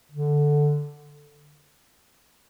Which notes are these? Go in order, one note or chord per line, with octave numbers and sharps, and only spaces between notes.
D3